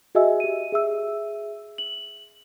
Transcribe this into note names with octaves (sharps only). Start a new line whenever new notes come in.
F#4 G#4 D#5 E5 G#5 E6
G4 D#7
G#4 E5 E6
F#7